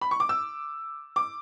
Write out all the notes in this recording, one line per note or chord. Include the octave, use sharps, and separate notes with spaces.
B5
C#6
D6
E6
D6